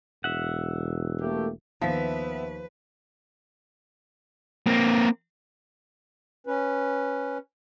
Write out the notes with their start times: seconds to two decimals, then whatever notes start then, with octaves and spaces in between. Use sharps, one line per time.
0.24 E1 E5 F#5
1.21 A3 A#3 G4
1.81 D#2 F3 B3 B4 E5 B6
4.67 A#3 C4
6.47 C#4 B4